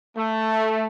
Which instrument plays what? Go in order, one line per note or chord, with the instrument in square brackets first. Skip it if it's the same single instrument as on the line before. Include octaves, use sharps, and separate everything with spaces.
[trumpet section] A3